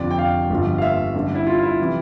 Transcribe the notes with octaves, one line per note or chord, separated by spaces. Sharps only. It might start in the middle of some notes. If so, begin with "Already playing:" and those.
Already playing: F1 F2 D3 F3 D5
G5
F5
G1 G2 D3 F3
F5
E5
A1 G2 D3
E4
F4
E4
C3 E3